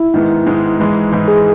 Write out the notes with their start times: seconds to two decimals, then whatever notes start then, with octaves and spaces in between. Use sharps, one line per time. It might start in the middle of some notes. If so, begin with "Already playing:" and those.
Already playing: E4
0.14 G#2 D#3 G#3 B3
0.47 G#2 D#3 G#3 B3
0.79 G#2 E3 G#3
1.12 G#2 E3 G#3
1.28 G#4